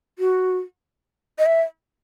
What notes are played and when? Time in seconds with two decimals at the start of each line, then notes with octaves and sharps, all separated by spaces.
0.19 F#4
1.39 D#5
1.46 E5